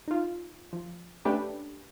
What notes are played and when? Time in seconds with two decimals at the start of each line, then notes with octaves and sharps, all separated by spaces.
0.08 D#4 F4
0.73 F3
1.25 A3 C#4 D4 G4 A4 B4